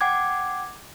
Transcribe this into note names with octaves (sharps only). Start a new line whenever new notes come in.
F#5 G5 D6 G#6